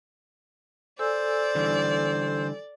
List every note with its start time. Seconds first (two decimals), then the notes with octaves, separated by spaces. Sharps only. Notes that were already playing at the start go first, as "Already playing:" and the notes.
0.99 A4 C5 D5 G#5 E6
1.55 D3 E3 G3